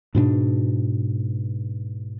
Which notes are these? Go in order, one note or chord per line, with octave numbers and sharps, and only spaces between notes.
G#2 B2 B3 D4